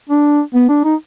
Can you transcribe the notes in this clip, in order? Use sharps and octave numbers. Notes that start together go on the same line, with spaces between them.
D4
B3
D4
D#4